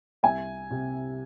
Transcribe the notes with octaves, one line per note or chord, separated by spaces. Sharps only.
C2 E5 G#5
C3